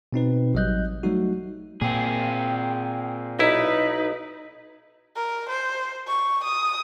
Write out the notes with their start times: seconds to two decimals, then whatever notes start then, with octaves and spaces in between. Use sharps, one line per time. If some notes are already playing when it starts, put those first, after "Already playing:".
0.13 B2 C4 D#4 B4
0.54 A1 F#3 G3 D#5 F#6 G6
1.03 F#3 G3 A3 D#4 F#4
1.81 A#2 A#3 C4 G#4 G5
3.39 B1 D#4 E4 B4
5.16 A#4
5.49 C5
6.08 C#6
6.44 D#6